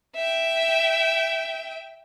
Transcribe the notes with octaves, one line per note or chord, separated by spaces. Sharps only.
E5 G5